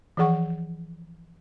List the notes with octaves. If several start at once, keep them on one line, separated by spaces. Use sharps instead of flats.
E3 F3 G#4 F#5 C#6